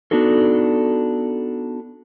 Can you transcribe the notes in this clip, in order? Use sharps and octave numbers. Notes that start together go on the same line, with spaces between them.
B3 D4 D#4 F#4 A4